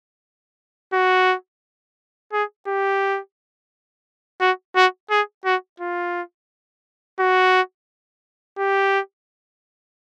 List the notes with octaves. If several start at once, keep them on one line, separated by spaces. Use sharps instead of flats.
F#4
G#4
G4
F#4
F#4
G#4
F#4
F4
F#4
G4